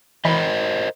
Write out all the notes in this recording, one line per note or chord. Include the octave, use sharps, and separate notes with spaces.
E3 A#4 C5 D#5 B5 G6